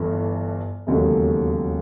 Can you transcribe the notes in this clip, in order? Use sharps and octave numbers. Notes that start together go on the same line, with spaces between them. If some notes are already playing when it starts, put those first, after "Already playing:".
Already playing: G1 G2 E3 A3
E1 D#2 C#3 F#3 A3